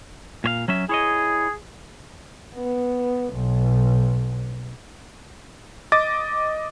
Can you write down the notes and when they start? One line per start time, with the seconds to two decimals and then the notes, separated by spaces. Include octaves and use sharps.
0.44 A#2 C#5 F5
0.68 F#3 C#4 E5
0.89 E4 G#4 C#5 D#5
2.55 B3
3.33 B1
5.92 D#5 D6 A6